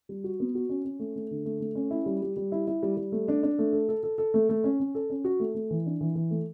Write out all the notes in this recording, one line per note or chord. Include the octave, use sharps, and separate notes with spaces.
G3
F#4
B3
F#4
C#4
C#4
A3
A3
D3
A3
A3
C#4
E4
G3
G3
G3
E4
E4
G3
G3
A3
D4
D4
A3
A4
A4
A4
A4
A3
A3
C#4
C#4
A4
C#4
F#4
A3
A3
E3
D4
E3
E3
A3